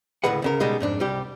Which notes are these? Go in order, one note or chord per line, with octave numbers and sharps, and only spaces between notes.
C#2 A2 D3 G#4 B4 F#5
D2 C#3 A#4
B2 G3 G#3 D#4
F2 G#2 D4
C2 G3 G4